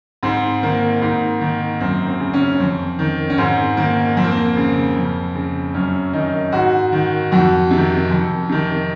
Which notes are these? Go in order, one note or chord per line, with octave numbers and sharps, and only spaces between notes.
G#2 C4
D#3 A#3
G#2
D#3
F#2 C4
C4
C#3
C#4
F2 C4
D#3
C#4
G#2 C4
D#3 A#3
F2 C4
A#3
C4
C#3
F2
C#3
F#2 C#4
D#3 D#4
G#2 F#4
D#3
F2 F#4
C3
D#3
F2
C3 D#3